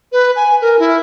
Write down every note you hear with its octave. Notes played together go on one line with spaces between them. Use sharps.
B4
G#5
A#4
E4